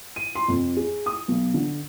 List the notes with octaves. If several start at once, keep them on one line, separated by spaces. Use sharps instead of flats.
D#7
C6
F2
G#4
D#6
B1
D3